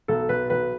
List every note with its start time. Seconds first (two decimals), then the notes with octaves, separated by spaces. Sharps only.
0.08 B1 A4
0.29 B1 B4
0.50 B1 B4